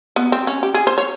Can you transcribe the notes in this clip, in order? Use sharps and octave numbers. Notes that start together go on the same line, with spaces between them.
B3
C4
C#4
G4
G#4
C5
C#5